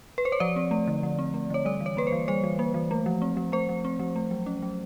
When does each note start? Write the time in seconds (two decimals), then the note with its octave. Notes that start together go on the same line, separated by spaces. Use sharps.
0.18 B4
0.25 C5
0.32 C#5
0.40 F3 D5
0.56 C4
0.71 A3
0.88 D3
1.03 F3
1.19 C4
1.34 A3
1.50 D3 C#5
1.65 G3 D5
1.80 E3
1.86 C#5
1.97 A#3 B4
2.07 C5
2.12 E3
2.28 G3 C5
2.44 E3
2.59 A#3
2.74 E3
2.91 A3
3.06 F3
3.22 C4
3.37 F3
3.52 A3 C5
3.69 F3
3.85 C4
3.99 F3
4.16 A3
4.31 F#3
4.46 C#4
4.62 F#3